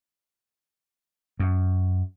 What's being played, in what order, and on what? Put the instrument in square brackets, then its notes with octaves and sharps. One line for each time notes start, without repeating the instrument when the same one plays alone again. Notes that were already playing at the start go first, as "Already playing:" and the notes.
[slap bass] F#2